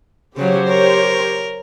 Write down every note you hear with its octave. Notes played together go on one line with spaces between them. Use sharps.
C#3 F#3 G4 C5 C#5
A#4